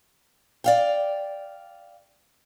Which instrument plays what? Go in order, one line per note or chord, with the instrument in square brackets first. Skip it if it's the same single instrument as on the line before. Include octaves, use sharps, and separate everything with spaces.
[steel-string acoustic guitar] D5 F5 G5